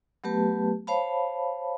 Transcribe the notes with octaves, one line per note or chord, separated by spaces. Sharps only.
F#3 A3 B3 G4 B4 A5
C5 C#5 F5 A5 B5